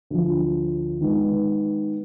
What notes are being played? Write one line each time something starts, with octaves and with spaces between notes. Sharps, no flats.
D2 D3 F3
D#3 G#3 B3